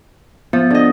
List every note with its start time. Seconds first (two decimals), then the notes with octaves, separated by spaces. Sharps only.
0.53 F3 B3
0.70 D3 D#5